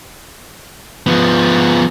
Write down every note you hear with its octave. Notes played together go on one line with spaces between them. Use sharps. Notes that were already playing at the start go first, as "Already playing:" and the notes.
F3 B3